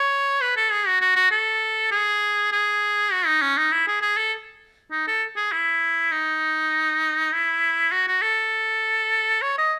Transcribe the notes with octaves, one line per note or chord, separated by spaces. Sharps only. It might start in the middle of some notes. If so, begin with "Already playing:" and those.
Already playing: C#5
B4
A4
G#4
F#4
F#4
F#4
A4
G#4
G#4
F#4
D#4
C#4
D#4
E4
G#4
G#4
A4
D#4
A4
G#4
E4
D#4
E4
F#4
F#4
A4
C#5
D#5